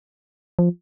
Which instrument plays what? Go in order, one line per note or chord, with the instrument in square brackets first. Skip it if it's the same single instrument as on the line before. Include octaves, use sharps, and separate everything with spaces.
[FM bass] F3